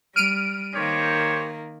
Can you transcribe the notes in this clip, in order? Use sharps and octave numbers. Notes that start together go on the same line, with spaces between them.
G3 F6 D7 D#7
D#3 A#3 G4 C5 C#5